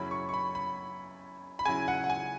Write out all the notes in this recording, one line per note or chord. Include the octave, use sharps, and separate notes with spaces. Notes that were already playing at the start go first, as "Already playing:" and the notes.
Already playing: F#2 C#3 F#3 C#4 E4 B5
C#6
C#6
B5
B5
B5
C#3 F#3 E4 G#5
F#5
F#5
G#5